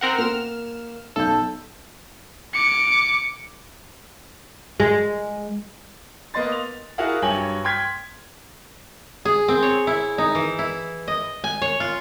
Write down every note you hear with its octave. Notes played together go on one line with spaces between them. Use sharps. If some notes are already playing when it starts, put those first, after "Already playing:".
C4 A#4 F#5
A#3 F6 E7
B1 A4 G6
D6 C#7
G#3
A#3 B3 D#5 C6 A6
F7
E4 F#4 G#4 A#4 F5 F#5
G2 F#3 C#5 G5 G#5 F#7
G5 C6 F6 G#6 B6
G#4
C4
C#5
E4
D#4
E3
E4
D#5
G#5
C#5
F4